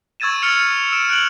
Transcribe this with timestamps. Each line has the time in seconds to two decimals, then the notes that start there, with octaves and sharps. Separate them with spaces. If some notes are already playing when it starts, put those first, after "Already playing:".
0.20 C#6 E6 G#6 A6 D#7 E7
0.42 F6 A6 C#7 D7 F7
0.92 E6 D7 E7
1.09 F#6 D7 F#7